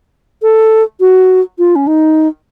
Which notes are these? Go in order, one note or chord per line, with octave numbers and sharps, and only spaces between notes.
A4
F#4
F4
C#4
D#4